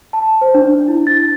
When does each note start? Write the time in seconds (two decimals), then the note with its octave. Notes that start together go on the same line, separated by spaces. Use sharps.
0.13 A5
0.41 C5
0.54 D4
0.88 E4
1.07 A6